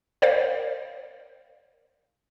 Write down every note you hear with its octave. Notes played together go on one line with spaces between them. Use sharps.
A#4 C5 D5 F5